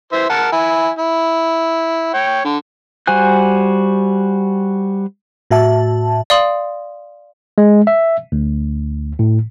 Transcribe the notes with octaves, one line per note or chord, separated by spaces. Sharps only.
E3 C5 E5
A#4 F#5 A5
E4 G#5
E4
C#5 G5
D3
G3 F#4 C5 G#5 F#6
A2 F#4 E5 A5
D5 F5 C6 D#6 F#7
G#3
E5
D2
A2